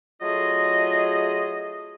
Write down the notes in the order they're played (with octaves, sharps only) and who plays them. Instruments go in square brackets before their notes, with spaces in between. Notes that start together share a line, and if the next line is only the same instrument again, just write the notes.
[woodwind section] F#3 A3 F4 G#4 D#5